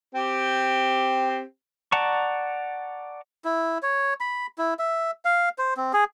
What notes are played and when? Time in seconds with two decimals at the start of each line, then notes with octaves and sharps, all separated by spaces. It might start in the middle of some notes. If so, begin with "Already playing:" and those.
0.15 C4 G4
1.92 D5 F#5 A5 A#5 C#6
3.45 E4
3.83 C#5
4.20 B5
4.58 E4
4.79 E5
5.25 F5
5.58 C5
5.77 C4
5.93 G#4